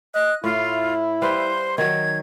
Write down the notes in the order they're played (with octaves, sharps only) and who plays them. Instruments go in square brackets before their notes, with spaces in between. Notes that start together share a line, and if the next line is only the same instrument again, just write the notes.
[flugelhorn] D#5 [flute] F#6
[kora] A2 [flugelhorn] E4 [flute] F4
[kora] G3 B4 F5 [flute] C5
[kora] D#3 F#3 [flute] G#6